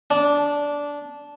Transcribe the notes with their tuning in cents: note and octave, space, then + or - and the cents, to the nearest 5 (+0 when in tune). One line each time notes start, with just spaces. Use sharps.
D4 -15